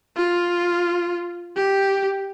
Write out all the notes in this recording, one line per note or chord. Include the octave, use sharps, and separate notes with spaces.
F4
G4